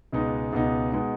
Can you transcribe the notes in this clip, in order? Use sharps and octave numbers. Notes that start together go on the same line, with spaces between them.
C#2 B2 G#3 B3 D#4
C#2 B2 G#3 B3 D#4
B2 G#3 B3 D#4